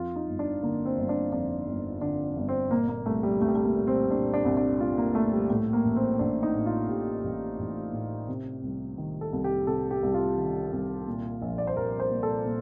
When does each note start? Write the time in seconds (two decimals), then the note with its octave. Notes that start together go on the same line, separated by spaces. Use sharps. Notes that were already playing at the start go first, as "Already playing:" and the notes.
Already playing: F2 F4
0.16 D#4
0.27 G1
0.39 D4
0.63 D3 A#3
0.85 C4
0.97 G1
1.09 D4
1.32 F2 D4
1.67 G1
2.01 D3 D4
2.36 G1
2.49 C4
2.71 A#2 A#3
2.89 A#3
3.06 C2 A3
3.23 G3
3.41 C2 A3
3.48 G3
3.55 A3
3.64 A#3
3.76 A#2
3.87 C4
4.11 A#2 D4
4.34 D4
4.45 C2
4.57 D4
4.80 C2 F4
4.98 A#3
5.15 A#2 A3
5.33 G3
5.50 A2 A3
5.73 A#3
5.85 A1
5.96 C4
6.19 A1 D4
6.43 D#4
6.55 A2
6.66 F4
6.89 A2 G4
7.24 A1
7.59 A1
7.93 A2
8.29 C3
8.63 C2
8.98 D#3
9.21 A4
9.32 C2
9.44 G4
9.67 C3 A4
9.91 G4
10.03 C2
10.14 F4
10.37 D#3
10.72 C2
11.07 A#2
11.42 A#1
11.58 D5
11.67 C5
11.77 A#1 A#4
12.00 C5
12.11 A#2
12.23 A4
12.46 A#2